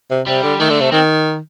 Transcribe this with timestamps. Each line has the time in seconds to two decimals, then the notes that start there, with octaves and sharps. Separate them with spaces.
0.10 C3
0.27 C3 G3
0.43 D3
0.59 D#3 A3
0.70 D3
0.81 C3
0.92 D#3 C4